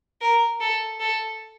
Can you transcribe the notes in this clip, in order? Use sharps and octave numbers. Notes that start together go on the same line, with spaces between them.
A#4
A4
A4